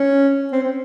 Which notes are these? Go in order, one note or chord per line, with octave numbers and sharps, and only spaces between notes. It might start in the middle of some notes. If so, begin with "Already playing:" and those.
Already playing: C#4
C4
C4